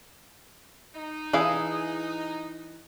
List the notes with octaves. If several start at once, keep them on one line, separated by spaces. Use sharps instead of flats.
D#4
E3 E4 G#4 F5